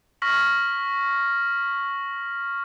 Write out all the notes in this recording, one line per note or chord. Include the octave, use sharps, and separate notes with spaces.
C#6 F6 A#6 B6 F#7